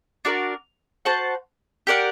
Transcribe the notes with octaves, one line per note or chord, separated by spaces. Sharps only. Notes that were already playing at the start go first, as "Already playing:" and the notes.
D4 F#4 A#4 D5
F#4 C5 F#5 A5
G4 A#4 D5 F#5